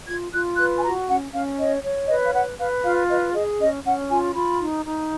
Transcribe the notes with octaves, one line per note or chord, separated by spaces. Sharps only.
F4 G#6
F4 F#6
B4 F#6
G#5
F#4 A#5
C#4 F#5
C#4 F5
C#5 D#5
C#5
B4 D#5
F5
B4 F#5
B4 F5
F4 F5
B4 D#5
G#4 D#5
C#4 D#5
C#4 F#5
F4 G#5
F4 B5
D#4
D#4